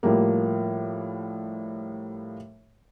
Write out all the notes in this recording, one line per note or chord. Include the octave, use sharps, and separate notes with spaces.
A2 F3 G3 A#3